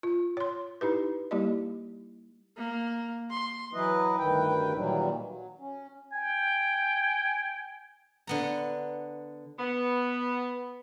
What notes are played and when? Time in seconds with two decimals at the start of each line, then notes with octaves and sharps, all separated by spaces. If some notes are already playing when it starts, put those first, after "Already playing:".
0.03 F4
0.37 C#5 C6
0.81 D#4 E4 G4 B4
1.31 G3 A#3 E4 G4 D5 D#5
2.57 A#3
3.30 C6
3.73 E3 F#3 E4 B4 D#5
4.18 D2 G2 D#3 E4 B4 G5
4.75 A#2 D#3 E3 F#3 G3
5.24 F#3
5.59 C#4
6.13 G5 G#5
8.27 D3 B3 A#5
9.59 B3